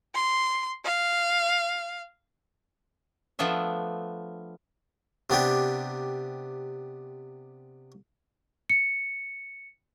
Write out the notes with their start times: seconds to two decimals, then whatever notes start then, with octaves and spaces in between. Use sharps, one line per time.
0.15 C6
0.85 F5
3.39 F3 A3 B3 D4 E5
5.30 C3 B3 D4 G4
8.70 C#7